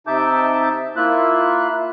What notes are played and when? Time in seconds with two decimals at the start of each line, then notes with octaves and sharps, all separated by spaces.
0.07 C3 D#4 E5 A5 D6 G6
0.96 A#3 E4 F4 E5 F#6